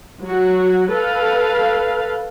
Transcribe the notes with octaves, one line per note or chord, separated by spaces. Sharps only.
F#3 F#4
A4 B4 F5